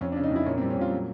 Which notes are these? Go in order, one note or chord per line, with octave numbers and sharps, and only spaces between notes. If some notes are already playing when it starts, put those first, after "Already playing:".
F2 C#4
D4
C#3
D#4
F2 E4
A#2 C#4
C4
G3
C#4
A#2 F4
F#3